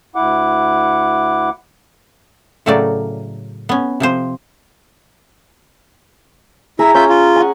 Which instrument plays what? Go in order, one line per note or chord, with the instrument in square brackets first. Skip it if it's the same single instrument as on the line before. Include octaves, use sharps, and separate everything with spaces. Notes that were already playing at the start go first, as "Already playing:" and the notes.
[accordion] D2 E4 F#5 D6
[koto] A2 C#3 F#3 A3 A#4 D5
B3 C#4
C3 F3 C5
[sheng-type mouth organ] E4 E5 [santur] G#4 G#5 A#5
[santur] C#4 [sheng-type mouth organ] F4 E5 G6
[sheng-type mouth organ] F4
[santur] F#5 G#5